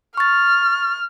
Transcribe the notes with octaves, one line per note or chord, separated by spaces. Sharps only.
C#6 F6 A6